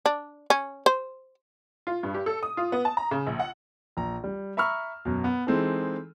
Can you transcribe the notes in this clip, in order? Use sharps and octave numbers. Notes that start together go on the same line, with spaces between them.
D4
C#4
C5
F4
G2
G4
A4
D#6
F4
B3
A5
A#5
C#3
A#1
F#5
A#1 A#5
G3
E5 A#5 B5 C#6 E6 F6
F#2 B2
B3
E3 G#3 C4 D#4 A4